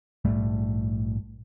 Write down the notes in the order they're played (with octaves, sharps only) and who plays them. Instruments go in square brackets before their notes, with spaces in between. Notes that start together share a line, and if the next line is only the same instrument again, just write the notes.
[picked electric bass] A#1 G#2 G3 A3